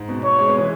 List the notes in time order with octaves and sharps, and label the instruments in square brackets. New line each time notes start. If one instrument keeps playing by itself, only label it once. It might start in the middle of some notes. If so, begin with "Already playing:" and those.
Already playing: [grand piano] G#2
B2
[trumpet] C#5
[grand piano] G#3
B3
E3 G#3